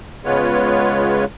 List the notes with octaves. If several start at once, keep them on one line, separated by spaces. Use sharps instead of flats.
C#3 G#3 B3 F4 B4 C#5